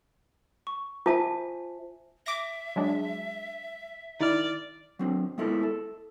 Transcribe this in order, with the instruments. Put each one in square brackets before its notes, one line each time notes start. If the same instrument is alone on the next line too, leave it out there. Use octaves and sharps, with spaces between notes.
[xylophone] C#6
[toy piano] F4 A5 [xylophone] C5 E5 G#5
[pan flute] E5 [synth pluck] D6 A#6
[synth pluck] F#3 G#3 D4
[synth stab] D#3 E4 F6 [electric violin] D5
[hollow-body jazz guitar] F#3 C4 D4
G#3 B3 E4 F4 A4 A#4
A4